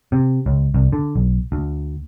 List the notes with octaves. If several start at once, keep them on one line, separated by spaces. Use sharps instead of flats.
C3
C#2
C2
D3
B1
D2